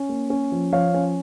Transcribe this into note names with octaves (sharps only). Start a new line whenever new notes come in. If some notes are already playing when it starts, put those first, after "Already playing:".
Already playing: C#4
A#3
C#4
F3
F3 C#5 F5
C#4